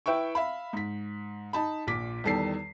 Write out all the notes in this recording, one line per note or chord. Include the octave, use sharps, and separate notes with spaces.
E4 B4 E5 G5 C#6
E5 F5 B5
G#2 B6
D#4 A5 B5
A#1 A#2 D6 B6
E2 D#3 G3 A4 A5 C7